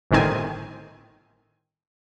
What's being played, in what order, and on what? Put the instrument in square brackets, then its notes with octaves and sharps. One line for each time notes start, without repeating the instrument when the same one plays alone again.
[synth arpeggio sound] G1 A2 D#3 C4 G#5